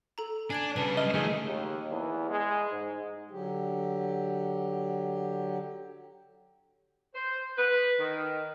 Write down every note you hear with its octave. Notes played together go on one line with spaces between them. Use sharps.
A4 A#5
D4 G#5 G#6 D7
C#3 G3 B4 A5
D#5 F6
D#3 F3 A3 G#4 E5
D#2
E2
G#3
G#2
D3 F#3 G4
C5
B4
D#3